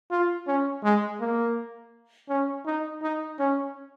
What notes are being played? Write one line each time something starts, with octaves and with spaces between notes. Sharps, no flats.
F4
C#4
G#3
A#3
C#4
D#4
D#4
C#4